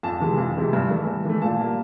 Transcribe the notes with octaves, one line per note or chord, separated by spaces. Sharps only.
F2 A5
C3 E3 G#3
F2
C3 E3 G#3
G2
E3 A3
G2
E3 A3
A#2 A5
G3 A#3